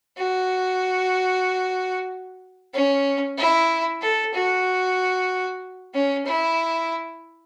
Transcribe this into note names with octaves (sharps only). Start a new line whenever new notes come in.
F#4
C#4
E4
A4
F#4
C#4
E4